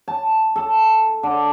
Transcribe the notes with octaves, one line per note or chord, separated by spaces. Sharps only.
A5
A4
D3